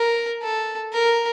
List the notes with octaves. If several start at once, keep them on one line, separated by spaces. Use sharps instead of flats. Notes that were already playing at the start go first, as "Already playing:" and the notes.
Already playing: A#4
A4
A#4